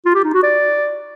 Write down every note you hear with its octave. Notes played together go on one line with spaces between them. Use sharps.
F4
G4
D#4
F#4
D5